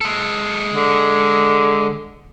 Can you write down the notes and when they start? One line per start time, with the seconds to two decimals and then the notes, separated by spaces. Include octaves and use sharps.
0.01 G#3 A4
0.74 D3